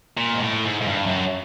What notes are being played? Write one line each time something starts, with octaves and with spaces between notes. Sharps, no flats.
A#2
G#2
A2
G#2
G#2
G2
F#2